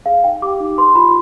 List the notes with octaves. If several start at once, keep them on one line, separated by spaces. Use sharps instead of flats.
G#4 F5
D#4 G5
G4 D6
D#4
B4 C6
F4 B5